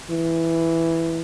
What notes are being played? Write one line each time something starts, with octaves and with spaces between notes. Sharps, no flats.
E3